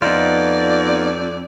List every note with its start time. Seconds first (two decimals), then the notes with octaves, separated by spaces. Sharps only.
0.02 F2 B3 D#4 F4 D5